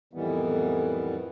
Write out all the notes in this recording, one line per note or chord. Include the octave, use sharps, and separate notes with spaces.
F2 A2 D#3 E3 G3 B3